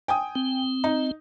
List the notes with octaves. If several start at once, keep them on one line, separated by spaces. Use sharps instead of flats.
G5 G#5 D#6
C4
D#4